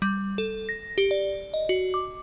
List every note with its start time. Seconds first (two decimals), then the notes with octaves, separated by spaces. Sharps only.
0.02 G3
0.38 A4
0.69 A#6
0.98 G4
1.11 D5
1.54 D#5
1.69 F#4
1.94 D6